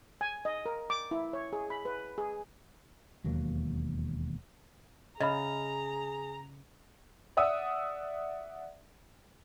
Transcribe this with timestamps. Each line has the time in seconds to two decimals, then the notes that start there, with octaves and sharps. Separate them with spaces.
0.21 G#5
0.45 D#5
0.66 A#4
0.90 D6
1.11 E4
1.33 C#5
1.53 G#4
1.70 B5
1.85 B4
2.18 G#4
3.24 E1 D#2 F#3 A#3
5.20 C#3 G#4 D#5 E5 A#5 B5
7.37 D5 E5 F#5 D#6 E6